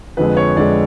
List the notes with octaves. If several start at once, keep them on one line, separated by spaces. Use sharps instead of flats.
F2 D3 G#3 B4
C#5
F2 D3 G#3 D5